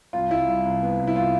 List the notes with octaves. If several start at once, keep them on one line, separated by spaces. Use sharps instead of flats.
C2 F4
C2 E4
C2
C2
B3
C2
E4
F4